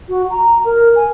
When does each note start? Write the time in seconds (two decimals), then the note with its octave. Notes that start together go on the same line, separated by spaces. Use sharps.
0.09 F#4
0.30 A#5
0.65 A#4
0.96 G#5